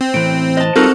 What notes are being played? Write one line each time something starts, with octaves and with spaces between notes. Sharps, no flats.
C4
A2 E3 D7
C5 D#5 A5
G3 C4 D#4 F4 F#4 A4 A#4